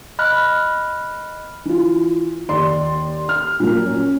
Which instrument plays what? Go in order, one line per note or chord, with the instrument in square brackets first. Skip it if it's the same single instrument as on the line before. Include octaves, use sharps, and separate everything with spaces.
[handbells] D#5 B5 F6 F#6
[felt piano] E3 F4
D#2 D5 C6
F6
A#2 F#3 A#3
C#4